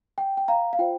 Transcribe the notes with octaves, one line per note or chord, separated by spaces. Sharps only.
G5
G5
F5 A#5
F5
F4 C5 G5